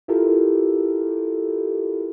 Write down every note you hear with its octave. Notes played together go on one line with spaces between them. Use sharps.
E4 F4 G4 A4 A#4